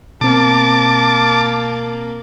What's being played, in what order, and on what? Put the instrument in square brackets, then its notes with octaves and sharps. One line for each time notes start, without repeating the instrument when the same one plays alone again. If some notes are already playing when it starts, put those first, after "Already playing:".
[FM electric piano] B2 C4 [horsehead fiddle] A#3 [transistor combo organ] A5 D6